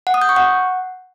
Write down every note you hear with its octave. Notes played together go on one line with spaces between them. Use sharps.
F#5
D#6
G6
C#6
F#5